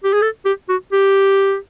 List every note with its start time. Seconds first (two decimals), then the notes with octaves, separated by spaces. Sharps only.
0.04 G4
0.13 G#4
0.22 A4
0.45 G4
0.69 F#4
0.92 G4